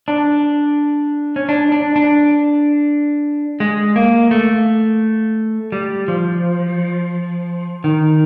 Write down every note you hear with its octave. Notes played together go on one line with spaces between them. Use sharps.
D4
C#4
D4
D4
D4
G#3
A#3
A3
G3
F3
D#3